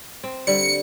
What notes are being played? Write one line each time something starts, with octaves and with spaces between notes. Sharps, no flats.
C4
D3 G3 C#7